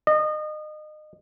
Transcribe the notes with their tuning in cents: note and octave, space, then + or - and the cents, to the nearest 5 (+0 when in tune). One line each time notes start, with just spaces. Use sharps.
D#5 -30